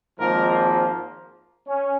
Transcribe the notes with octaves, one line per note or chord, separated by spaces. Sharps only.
G#1 G#2 F3 A#3 A#4
C#4